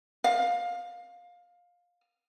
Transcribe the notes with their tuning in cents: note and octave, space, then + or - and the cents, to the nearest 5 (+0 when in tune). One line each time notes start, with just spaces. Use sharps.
F5 +20